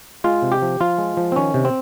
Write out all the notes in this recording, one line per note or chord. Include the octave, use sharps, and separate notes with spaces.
G#3 F4
C3
G4
F3
F3 F4
G#3
F3
C4
D#3 C#4
C3
C4